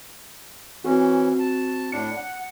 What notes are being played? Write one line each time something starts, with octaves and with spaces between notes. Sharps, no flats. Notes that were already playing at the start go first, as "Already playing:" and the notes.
E3 C4 C#4 F#4
A5
A2 D4 C#7
F#5